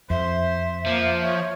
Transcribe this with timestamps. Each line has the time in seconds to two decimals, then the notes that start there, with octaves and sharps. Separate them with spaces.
0.10 F2 C5 E5
0.86 F3 A#3
1.22 C#5